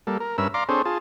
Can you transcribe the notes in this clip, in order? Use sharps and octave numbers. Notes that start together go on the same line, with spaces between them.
G3 A#3 A4
A#4
G2 C#4 A#4 B4 E5 E6
D5 F5 A#5 C6 D6
C4 D4 G#4 A4 C5 C#5
F4 G#4 A5